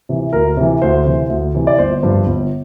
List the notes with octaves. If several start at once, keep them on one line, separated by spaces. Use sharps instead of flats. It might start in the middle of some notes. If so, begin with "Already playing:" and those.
C3 E3
D2 A#4
C3 E3
D2 C5
C3 E3
D2
C3 E3
D5
G1 C5
G2 F3
G1